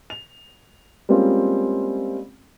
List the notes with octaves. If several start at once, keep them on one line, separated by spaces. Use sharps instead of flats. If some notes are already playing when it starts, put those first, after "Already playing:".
F7
G3 G#3 A#3 C4 C#4 F4